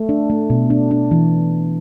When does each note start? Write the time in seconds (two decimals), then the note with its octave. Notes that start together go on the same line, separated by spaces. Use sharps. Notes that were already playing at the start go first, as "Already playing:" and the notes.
Already playing: A3
0.09 D4
0.30 A3
0.50 B2
0.70 D4
0.91 D4
1.11 E3